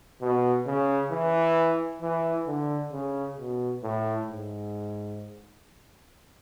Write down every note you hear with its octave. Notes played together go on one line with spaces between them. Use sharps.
B2
C#3
E3
E3
D3
C#3
B2
A2
G#2